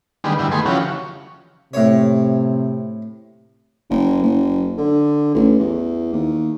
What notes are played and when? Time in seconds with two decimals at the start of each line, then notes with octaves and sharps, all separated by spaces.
0.24 D3 D#3 G3 G#3 B3
0.39 F#2 D3 G3 E4
0.52 D#3 A3 B3 G#4 C6
0.66 C#3 E3 F3 C#4 F#4 G4
1.74 A2 C3 C#5
3.90 F#1
4.23 F#1
4.78 D3
5.35 A1
5.59 E2
6.13 D#2